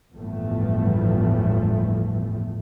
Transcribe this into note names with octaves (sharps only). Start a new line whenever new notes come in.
G1 E2 A2 F3 G3 A3